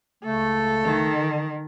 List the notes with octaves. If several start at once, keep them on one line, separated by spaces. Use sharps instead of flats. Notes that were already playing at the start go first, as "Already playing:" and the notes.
C#2 C#3 A3 A4
D#3